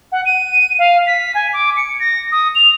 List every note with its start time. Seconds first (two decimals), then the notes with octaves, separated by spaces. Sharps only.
0.12 F#5
0.26 D#7
0.79 F5
1.07 B6
1.35 G#5
1.53 D6
1.77 C#7
2.00 A#6
2.32 D#6
2.55 F7